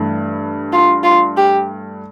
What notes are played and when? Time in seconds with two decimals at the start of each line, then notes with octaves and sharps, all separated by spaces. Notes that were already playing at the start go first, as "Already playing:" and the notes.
Already playing: G2 E3 A3
0.73 F4
1.04 F4
1.37 G4